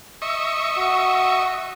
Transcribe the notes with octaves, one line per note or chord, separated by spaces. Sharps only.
D#5 E5 C#6
F#4